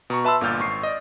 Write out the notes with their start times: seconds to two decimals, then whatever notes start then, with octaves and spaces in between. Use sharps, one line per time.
0.10 B2 A#5 C#6
0.24 B4 E5 A5 B5 C6 E6
0.41 G1 A#2 A#3 F6 G6 A6
0.59 G#1 C#6 C7
0.83 D5 D#5